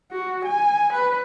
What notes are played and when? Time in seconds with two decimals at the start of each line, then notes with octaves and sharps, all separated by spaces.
0.12 F#4
0.45 G#5
0.93 B4